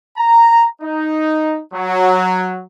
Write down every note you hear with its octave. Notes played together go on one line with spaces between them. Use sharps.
A#5
D#4
F#3